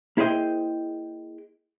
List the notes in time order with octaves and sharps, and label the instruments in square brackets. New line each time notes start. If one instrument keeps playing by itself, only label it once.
[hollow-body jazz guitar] A#3 E4 G#4 C5 D#5 G5